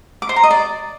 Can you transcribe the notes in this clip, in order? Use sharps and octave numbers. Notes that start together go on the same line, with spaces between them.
D6
C5
A#5
D#5
D5